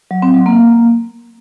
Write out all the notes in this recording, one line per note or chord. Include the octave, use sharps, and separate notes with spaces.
F#3
C4
F#3
A#3